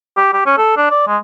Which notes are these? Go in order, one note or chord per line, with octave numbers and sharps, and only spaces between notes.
G4
G4
C#4
A4
D4
D5
G#3